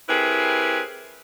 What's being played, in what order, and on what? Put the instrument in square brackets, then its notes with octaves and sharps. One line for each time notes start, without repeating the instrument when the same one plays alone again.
[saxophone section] C4 E4 G4 G#4 A#4 B4